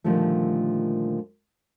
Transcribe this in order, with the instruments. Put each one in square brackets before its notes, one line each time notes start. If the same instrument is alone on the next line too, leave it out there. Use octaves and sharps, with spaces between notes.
[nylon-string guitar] A#2 D3 D#3 F3 G3 A3